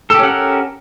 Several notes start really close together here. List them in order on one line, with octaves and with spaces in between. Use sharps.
A4 G4 C#4 F#5 A#4